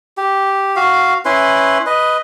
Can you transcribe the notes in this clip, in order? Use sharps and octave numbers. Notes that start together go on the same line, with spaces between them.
G4
F#4 F5
C#4 E4 B4 C6
B4 D#5